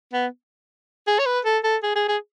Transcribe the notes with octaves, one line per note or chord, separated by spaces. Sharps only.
B3
G#4
C#5
B4
A4
A4
G#4
G#4
G#4